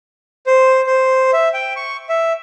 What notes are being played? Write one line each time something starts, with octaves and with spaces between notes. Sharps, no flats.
C5
C5
E5
G5
C#6
E5